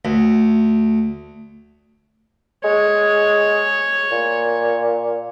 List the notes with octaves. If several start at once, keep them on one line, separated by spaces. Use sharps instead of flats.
D2
G#3 C#5
A#2